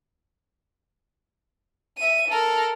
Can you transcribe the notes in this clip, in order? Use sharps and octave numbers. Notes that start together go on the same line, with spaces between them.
E5 D#7
A4 A#4